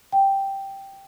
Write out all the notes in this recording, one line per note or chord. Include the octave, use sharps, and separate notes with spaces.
G5